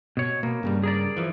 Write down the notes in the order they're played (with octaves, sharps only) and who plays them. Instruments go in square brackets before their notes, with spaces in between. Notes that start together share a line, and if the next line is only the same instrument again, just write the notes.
[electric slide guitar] B2 C#5
[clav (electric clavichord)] B2 [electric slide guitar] A#3
[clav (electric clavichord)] G2 C#3 G3
[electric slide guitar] G#4 A#4 D5
[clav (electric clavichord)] E3 F3